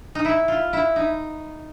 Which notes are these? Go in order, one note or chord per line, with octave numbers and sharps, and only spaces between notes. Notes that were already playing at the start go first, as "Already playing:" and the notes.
D#4
E4
F4
E4
D#4